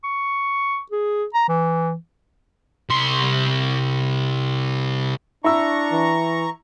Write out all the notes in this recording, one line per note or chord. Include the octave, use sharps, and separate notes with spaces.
C#6
G#4
A#5
E3
C2 C6
D4 E4 A#5 C#6 E6
E3